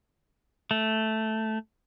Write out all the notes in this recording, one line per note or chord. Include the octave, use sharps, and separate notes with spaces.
A3